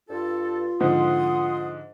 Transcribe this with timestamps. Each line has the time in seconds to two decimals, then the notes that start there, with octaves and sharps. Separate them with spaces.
0.09 G2 F4 A4
0.80 G#2 D3 F3 F#5 C6 D#6